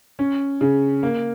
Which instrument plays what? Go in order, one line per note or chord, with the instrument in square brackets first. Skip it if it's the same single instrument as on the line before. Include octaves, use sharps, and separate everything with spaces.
[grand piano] C#4
C#3
A#3